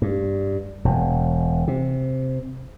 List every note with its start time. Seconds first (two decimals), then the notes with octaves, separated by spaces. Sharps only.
0.02 G2
0.85 E1
1.68 C3